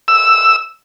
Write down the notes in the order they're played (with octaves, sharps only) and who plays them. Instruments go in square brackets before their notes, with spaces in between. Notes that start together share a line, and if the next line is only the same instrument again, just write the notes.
[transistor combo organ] E6